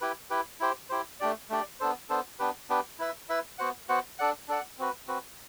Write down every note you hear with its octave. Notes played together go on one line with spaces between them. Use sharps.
E4 G4 B4
E4 G4 B4
E4 G4 C5
E4 G4 C5
A3 D4 G4 D5
A3 D4 G4 D5
B3 D4 A4 C5
B3 D4 A4 C5
B3 D4 G4 B4
B3 D4 G4 B4
E4 B4 E5
E4 B4 E5
B3 F#4 C5 F#5
B3 F#4 C5 F#5
D4 A4 D5 F#5
D4 A4 D5 F#5
C4 F#4 B4
C4 F#4 B4